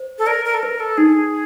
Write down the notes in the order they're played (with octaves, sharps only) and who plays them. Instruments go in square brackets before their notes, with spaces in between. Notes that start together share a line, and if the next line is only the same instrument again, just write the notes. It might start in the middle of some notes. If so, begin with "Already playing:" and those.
Already playing: [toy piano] C5
[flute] A4
[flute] A#4 [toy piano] D5
[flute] A#4
A4
[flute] A#4 [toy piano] B4
[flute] A4
[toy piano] D#4 [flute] G#4